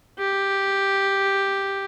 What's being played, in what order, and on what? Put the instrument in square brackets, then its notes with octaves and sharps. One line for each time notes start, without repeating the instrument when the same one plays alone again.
[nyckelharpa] G4